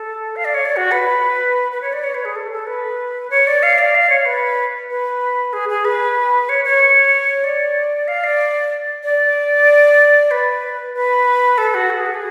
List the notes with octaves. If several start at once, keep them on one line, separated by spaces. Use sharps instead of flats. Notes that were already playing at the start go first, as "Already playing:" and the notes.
Already playing: A4
F5
D5
C#5
D5
F#4
B4
B4
C#5
D5
C#5
B4
G#4
A4
A4
B4
C#5
D5
F5
D5
F5
C#5
B4
B4
G#4
G#4
B4
C#5
C#5
D5
F5
D5
D5
B4
B4
A4
F#4
A4
G#4
F#4
G#4